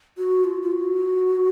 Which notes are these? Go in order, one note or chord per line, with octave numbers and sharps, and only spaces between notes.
F#4
F4
F4
F#4